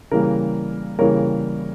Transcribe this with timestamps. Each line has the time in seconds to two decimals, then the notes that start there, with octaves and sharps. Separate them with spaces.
0.11 C#3 E3 G3 A#3 A#4
0.99 C#3 E3 G3 A#3 A#4 C#5